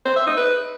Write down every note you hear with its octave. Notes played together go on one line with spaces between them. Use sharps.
C5
E5
D#4
B4